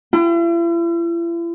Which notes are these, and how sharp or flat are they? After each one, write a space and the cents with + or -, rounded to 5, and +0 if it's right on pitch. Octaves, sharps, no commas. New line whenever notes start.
E4 +45